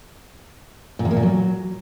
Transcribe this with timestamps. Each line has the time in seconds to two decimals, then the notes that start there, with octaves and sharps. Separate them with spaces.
0.99 A#2
1.05 E2
1.11 A#3
1.17 A#2
1.22 F#3